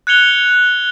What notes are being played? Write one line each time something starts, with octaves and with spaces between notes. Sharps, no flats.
F#6 G#6 C#7 F7 G7